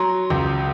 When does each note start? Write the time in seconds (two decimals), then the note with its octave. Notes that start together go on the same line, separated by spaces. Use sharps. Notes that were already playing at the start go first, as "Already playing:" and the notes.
Already playing: F#3 A#5 C6
0.30 C#2